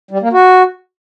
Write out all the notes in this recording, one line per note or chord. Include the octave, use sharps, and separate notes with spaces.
G3
A#3
F#4